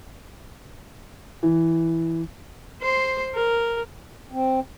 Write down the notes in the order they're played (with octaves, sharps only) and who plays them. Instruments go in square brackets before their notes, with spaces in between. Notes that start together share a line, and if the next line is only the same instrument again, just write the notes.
[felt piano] E3
[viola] C5 C6
A#4
[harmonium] C4